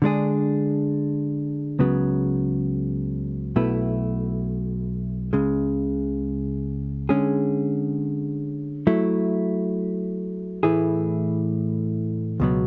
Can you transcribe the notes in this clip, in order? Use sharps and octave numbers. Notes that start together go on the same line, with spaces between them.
D3 G#3 D4 G#4
C#2 C#3 F#3 B3
B1 B2 A3 E4 B4
C#2 C#3 G#3
D3 G#3 C#4 G#4
F#3 A3 E4
A2 E3 A3 E4 G#4
C#2 B2 F#3 B3